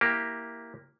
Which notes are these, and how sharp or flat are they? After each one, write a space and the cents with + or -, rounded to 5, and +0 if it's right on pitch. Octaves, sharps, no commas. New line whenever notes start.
A#3 +0 E4 +0 G4 +0